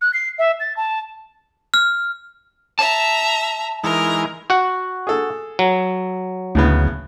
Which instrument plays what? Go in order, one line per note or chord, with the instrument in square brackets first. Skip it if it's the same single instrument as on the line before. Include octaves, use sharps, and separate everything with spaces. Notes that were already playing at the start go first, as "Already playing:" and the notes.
[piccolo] F#6
C7
E5
A6
A5
[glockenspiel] F6
[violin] E5 A#5 [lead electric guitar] A5
[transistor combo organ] E3 G#3 D#4 [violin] A#4
[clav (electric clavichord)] F#4 F#5
[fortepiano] G#4 A4
[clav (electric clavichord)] F#3
[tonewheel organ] D2 [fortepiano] A2 C#3 B3